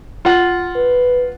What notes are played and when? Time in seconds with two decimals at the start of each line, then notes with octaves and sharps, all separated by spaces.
0.25 F4 F#5
0.76 B4